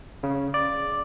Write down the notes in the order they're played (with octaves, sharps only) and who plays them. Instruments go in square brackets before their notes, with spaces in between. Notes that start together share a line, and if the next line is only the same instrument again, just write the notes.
[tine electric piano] C#3
D5